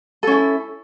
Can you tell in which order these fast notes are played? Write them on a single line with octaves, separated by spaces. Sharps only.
A4 C#4 E4